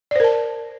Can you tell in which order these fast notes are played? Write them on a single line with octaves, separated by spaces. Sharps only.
D5 C5 A#4 A5